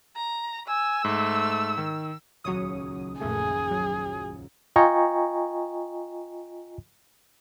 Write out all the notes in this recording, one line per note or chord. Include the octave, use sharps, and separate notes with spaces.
A#5
G#5 E6
G#2 A3
D#3
D#1 C#2 F#3 C#5 D#6 C#7
A#1 F#2 A#2 A3 G#4 G#5
F#3
F4 D#5 G5 G#5 A#5 C#6